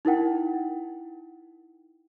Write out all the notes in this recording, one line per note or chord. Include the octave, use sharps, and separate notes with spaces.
D#4 E4 A#4 F#5 G5